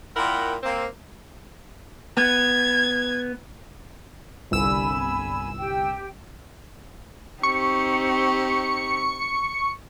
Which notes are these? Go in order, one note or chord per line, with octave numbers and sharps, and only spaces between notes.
A#2 E4 A#4 F#5 G5
A#3 C4
B3 G#6
G1 C2 G#5 B5 E6
G4 G5
C4 D#4 G4 C#6 C#7